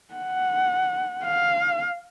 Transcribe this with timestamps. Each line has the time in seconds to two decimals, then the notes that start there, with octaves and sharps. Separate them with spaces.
0.14 F#5
1.25 F5